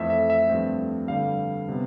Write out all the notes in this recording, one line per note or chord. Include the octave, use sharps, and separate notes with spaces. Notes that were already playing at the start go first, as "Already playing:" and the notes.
Already playing: F2 E3 A3 E5
E5
E5
G2 F3 A3 C4
G2 D3 G3 F5
C3 G3 B3